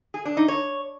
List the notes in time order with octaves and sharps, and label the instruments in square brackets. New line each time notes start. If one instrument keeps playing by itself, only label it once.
[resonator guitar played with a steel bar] G#4
D4
D#4
C#5